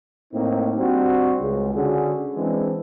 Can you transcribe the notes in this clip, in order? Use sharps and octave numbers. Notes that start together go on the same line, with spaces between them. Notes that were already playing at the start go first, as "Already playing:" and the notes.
A2 A#3 C4 D#4
G3 C4 D4 F#4
C#2 C#3
D3 C#4 F#4 G#4
E3 G#3 C4 D4